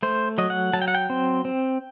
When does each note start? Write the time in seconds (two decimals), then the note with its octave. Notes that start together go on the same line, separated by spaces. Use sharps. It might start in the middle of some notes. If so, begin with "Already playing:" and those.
0.03 A3 C5
0.38 F#3 D#5
0.50 F#5
0.73 F#3 A5
0.82 G5
0.88 F#5
0.95 G5
1.10 C4
1.45 C4